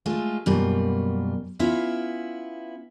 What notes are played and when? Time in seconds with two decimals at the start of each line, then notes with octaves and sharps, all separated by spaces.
0.06 G#3 A3 F4
0.46 F#2 B2 G3 A#3 F4
1.59 B3 C#4 E4 F4